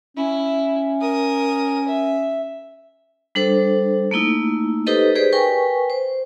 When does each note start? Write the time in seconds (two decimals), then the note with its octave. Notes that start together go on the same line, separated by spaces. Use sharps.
0.17 C#4 E4
1.01 A#4 D#6
1.88 E5
3.35 G3 D4 A4 C5
4.11 A3 A#3 D#4 E4
4.87 D#4 G4 A4 B4 C5 D#5
5.15 G4 G#4 B4 C5 D5
5.33 A#4 B4 G5 G#5 C#6
5.90 C5